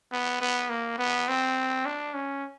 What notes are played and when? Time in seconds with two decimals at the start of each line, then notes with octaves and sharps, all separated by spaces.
0.12 B3
0.41 B3
0.70 A#3
0.98 B3
1.28 C4
1.86 D4
2.14 C#4